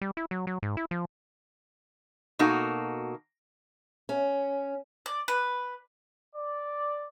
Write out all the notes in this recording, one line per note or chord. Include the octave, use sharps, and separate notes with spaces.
G3
E4
F#3
F#3
G#2
E4
F3
B2 A#3 D#4 F#4 A4
C#4
D5
B4
D5